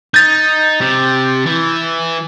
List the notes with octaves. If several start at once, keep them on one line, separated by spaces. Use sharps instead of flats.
D#4 G6 A6
C3
E3